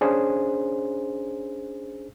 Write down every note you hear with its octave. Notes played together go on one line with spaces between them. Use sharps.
C#4 D4 G#4 C5